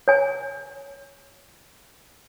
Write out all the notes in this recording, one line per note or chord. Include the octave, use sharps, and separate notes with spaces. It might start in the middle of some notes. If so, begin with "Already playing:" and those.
C#5 G#5